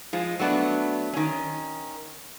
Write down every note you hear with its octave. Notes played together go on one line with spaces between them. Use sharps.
F3 G#3
F#3 A3 B3 D4
D#3 C#4